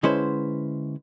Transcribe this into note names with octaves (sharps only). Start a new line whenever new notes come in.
D3 G#3 C#4 E4 B4 C5